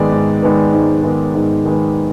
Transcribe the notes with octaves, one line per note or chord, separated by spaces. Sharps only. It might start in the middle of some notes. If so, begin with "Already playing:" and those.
Already playing: G#2 D#3 G#3 B3 D5
G#2
D#3 G#3 B3
G#2
D#3 G#3 B3
G#2
D#3 G#3 B3